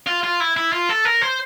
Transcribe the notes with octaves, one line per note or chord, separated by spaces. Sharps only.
F4
F4
E4
E4
F4
A4
A#4
C5